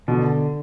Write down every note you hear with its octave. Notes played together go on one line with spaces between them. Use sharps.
B2 D3